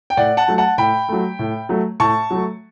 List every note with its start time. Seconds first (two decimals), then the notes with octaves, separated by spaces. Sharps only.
0.10 G5
0.17 A2 D5 F#5
0.37 F#5 A5
0.48 F#3 A3
0.58 F#5 A5
0.78 A2 G5 B5
1.08 F#3 A3
1.39 A2
1.69 F#3 A3
2.00 A2 A5 C#6
2.31 F#3 A3